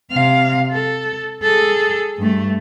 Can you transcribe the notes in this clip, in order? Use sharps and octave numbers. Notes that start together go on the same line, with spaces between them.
C3 F5
A4
G#4 A4
G2 A3